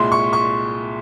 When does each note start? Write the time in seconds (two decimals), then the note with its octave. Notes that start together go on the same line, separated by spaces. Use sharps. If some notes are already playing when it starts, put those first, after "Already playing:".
Already playing: C2 A#2 G#3 C6
0.12 C#6
0.33 C#6